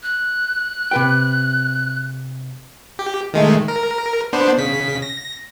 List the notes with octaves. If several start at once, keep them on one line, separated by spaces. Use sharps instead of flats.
F#6
C3 B4 G5
G4
D#3 G#3 A3
A#4
B3 D4 C5
C#3 B6
A#6